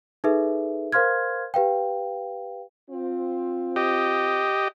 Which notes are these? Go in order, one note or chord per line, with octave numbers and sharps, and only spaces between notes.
D#4 G#4 A4 B4 E5
A#4 C5 F5 C6 F6 G#6
G4 B4 F5 G5
C4 F4
G4 D#5